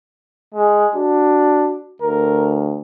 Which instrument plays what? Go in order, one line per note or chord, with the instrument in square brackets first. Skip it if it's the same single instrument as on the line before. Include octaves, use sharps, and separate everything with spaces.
[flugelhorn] G#3
[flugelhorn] D4 [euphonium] F#4
[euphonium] D2 [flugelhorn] A#4